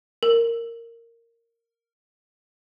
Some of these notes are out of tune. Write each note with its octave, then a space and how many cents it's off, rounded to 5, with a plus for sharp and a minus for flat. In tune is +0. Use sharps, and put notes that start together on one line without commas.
A#4 -10